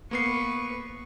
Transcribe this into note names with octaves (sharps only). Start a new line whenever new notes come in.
A#3 B3 B4 C#6 C7